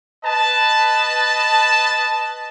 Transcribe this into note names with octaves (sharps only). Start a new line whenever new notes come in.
B4 D#5 A5